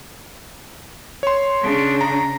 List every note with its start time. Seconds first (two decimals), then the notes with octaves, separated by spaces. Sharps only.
1.23 C#5 C6
1.62 C#3 D4
2.01 A#5